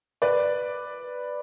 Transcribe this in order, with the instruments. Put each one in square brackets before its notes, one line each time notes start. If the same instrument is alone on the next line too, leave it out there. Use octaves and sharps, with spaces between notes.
[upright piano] B4 D5